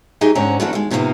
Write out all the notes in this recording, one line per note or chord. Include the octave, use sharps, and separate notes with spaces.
F#3 D#4 G4 G#4 D#5
G#2 D3 C4 C#4 F#4 A#5
D3 E3 A#3 C#4 F#4 A4
D#2 G#3
A2 C3 D#3 F3 A#3 B3